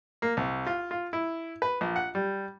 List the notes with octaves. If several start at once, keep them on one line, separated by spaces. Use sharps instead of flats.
A#3
C2
F4
F4
E4
B4
A#1
F#5
G3